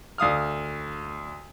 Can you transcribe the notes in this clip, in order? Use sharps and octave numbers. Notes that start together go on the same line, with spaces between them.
D2 F5 D#6 F6